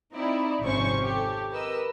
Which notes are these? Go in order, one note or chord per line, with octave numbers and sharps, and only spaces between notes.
C4 D#4 E4 D5
G#1 F2 C3 C#4 C5 C#6
G4 A4
A#4 B4 D#5 E6